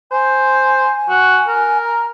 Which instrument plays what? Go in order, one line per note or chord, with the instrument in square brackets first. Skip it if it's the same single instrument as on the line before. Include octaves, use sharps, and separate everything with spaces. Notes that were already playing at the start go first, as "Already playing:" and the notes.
[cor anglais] C5 [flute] G#5
[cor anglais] F#4
A#4
[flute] A#5